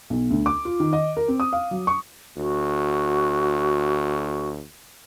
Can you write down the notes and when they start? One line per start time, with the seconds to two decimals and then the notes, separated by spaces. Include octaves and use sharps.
0.10 B1
0.30 D2
0.46 D6
0.65 F4
0.80 D#3
0.93 D#5
1.17 A#4
1.28 C4
1.40 D#6
1.53 F5
1.71 F#3
1.87 C#6
2.37 D2 F#4